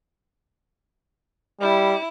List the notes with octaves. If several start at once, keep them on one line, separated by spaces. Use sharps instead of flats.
G3 E4